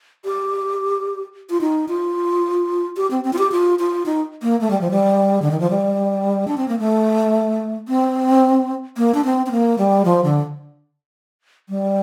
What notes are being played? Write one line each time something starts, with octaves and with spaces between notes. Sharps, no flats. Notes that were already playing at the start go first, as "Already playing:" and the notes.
G4
F4
D#4
F4
G4
C4
C4
F4
G4
F4
F4
D#4
A#3
A3
G3
F3
G3
D3
D#3
F3
G3
D4
C4
A#3
A3
C4
A#3
D4
C4
C4
A#3
G3
F3
D3
G3